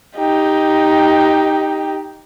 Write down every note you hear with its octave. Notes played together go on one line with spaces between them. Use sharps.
D#4 G4